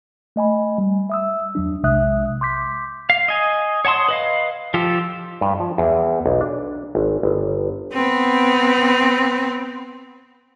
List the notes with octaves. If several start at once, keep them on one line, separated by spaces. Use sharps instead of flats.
A3 D#5 G#5 B5
G3
E5 D#6 E6
E2 F#3 D4
B1 C3 G#3 E5 D#6 F#6
C6 D6 G6 B6
F5
D#5 G#5
C#5 F#5 A5 C6 D#6
B4 D#5 F5
F3 F4 G4 A4
G2
F3
E2
B1
D4
G#1
G1
B3 C4